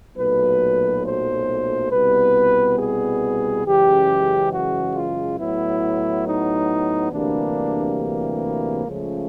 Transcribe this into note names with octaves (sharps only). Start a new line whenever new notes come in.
B1 A#2 F#3 A3 B4
C5
C2 B2 G3 B3 B4
G#4
F#2 C#3 E3 G#3 G4
F#4
F4
A2 F#3 B3 E4
D#4
D2 C3 E3 G3 A#3 D4
C#2 C#3 F3 A3